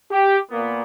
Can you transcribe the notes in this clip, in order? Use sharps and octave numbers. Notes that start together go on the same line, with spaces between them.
G4
A#2 A#3 B3